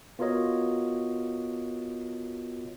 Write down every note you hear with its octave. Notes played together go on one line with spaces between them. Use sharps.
B3 F4 F#4 A#4 C#5 D#5